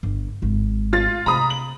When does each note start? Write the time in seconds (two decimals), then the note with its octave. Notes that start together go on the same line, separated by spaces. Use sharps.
0.03 G1
0.42 G#1
0.93 F4 A6
1.26 C3 A#5 B5 D#6
1.50 F#7